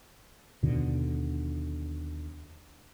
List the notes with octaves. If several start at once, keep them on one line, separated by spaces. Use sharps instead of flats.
D#2 B2 D3